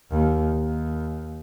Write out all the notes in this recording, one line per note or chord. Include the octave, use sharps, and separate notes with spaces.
D#2
D#2